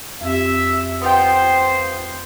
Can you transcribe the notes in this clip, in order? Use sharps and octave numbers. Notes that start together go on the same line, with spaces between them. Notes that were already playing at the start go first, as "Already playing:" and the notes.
F2 C4 G4 E5
B3 F4 C5 G5